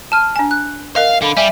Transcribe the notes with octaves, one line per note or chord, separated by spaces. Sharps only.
A5 F6 D#7
D4 G#5
F#6
A#4 D#5 F5
D3 F5 B5
G3 E5 G#5